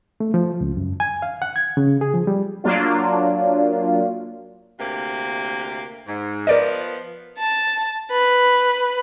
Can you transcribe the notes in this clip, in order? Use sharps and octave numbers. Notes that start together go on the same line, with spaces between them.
A3
F3
C#2
F#2
G#5
F5
F#5
G#6
C#3
G#4
F3
G3
F#3 A#3 D4 F4
D2 C3 A#3
G#2
F3 B3 A#4 D5 D#5
A5
B4